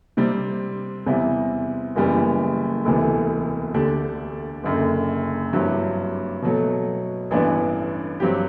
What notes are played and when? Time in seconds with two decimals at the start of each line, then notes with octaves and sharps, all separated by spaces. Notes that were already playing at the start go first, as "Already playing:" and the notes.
0.17 C3 G3 C4
1.06 E2 C3 G3 C4 E4
1.96 F#1 F#2 E3 G3 B3
2.85 E1 D2 C3 E3 A3
3.74 D2 D3 A3 D4 G4
4.64 F#1 F#2 D3
5.53 G2 F#3 C4 E4 G4
6.42 B2 F#3 A3
7.31 A1 G2 E3 B3 D4
8.20 G2 F#3 C4 G4